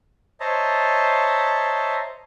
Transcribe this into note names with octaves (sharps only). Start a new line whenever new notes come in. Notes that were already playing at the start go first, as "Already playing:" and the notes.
C5 C#5 D#5 E5 A5 A#5